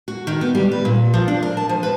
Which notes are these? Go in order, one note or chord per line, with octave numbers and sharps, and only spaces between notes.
F#4
D#3
B3
G3
B4
A#2
F3
D4
A#4
A5
F3
B4